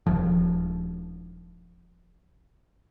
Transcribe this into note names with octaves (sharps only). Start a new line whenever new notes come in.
D#1 F3